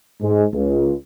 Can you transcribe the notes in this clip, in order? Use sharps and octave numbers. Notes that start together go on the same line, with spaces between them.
G#2 G#3
C#2